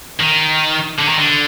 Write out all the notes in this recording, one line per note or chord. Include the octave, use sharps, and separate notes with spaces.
D#3
D3
D#3
D3